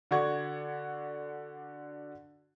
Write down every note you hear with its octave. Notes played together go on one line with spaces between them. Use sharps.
D3 F#4 D5 F#5 C#6 G#6